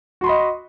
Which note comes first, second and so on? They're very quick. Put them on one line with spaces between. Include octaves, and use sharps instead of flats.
F#4 C6 B5 D#5